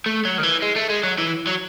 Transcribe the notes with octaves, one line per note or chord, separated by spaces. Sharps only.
A3
F#3
D#3
E3
G#3
A3
G#3
F#3
E3
F#3